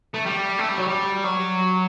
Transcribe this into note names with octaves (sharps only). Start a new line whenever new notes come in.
A3
G3
A3
G3
F#3
G3
F#3